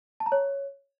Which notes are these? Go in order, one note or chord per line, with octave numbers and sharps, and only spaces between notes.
A5
A#5
C#5